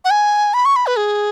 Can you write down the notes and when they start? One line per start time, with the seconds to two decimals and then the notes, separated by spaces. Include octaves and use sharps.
0.05 F#5
0.10 G#5
0.54 B5
0.65 C#6
0.76 B5
0.87 B4
0.97 G#4